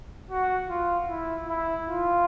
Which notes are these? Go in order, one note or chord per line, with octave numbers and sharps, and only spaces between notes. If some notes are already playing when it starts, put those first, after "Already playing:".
F#4
F4
E4
E4
F4